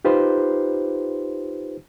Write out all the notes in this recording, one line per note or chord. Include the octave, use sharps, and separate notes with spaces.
D#4 F4 G4 B4 C5